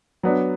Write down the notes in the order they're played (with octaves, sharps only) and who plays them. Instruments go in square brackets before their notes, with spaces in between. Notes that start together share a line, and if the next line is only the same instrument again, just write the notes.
[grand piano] F#3 B3 D4